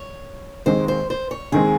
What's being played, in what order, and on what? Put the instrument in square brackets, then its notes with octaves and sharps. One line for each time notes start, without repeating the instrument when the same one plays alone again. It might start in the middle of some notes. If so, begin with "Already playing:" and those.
Already playing: [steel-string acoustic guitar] C#5
[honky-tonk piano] D#2 D#3 G#3 C4 [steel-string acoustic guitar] C5
[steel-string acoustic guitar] C5
C5
C#5
[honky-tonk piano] D#2 D#3 G#3 C4 [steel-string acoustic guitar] G#4